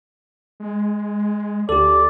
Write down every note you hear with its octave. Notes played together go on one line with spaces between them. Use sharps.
G#3
D2 G4 A4 D5